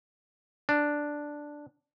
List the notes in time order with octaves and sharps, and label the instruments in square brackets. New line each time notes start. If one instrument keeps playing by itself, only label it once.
[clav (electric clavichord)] D4